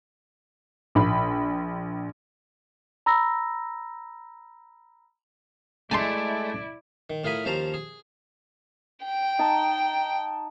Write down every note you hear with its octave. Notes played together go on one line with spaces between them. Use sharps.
A#1 B5
A#5 B5 E6 A#6
G#3 A3 E4 D5 G#5 A5 C6
D#3
A2 F4 G#4 A#4 B5 D#6
D#2 F3 C#4 C5 A5 A#5
G#4
G5
D#4 A5